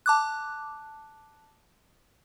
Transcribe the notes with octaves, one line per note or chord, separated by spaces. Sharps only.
A5 D6 F#6